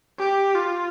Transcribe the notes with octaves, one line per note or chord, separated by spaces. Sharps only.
G4
F4